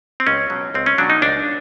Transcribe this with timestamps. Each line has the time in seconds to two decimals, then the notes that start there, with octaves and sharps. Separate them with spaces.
0.20 C4
0.27 C#2 C#4
0.50 B2 F#3
0.74 C#2 C4
0.86 C#4
0.98 B2 F#3 D4
1.10 D#4
1.22 C#2 D4